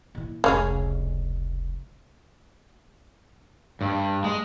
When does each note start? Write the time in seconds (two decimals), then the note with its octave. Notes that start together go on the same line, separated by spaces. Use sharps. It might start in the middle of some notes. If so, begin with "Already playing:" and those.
0.15 A#2 E3
0.44 F1 C#2 C#3 C#4 G#4
3.81 G2
4.24 G#3